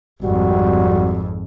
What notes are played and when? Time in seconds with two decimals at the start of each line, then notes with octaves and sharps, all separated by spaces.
0.22 G#1 F2 G3 F#4